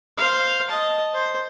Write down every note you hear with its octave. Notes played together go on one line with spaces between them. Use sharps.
C5 F5
D#5 A5
C5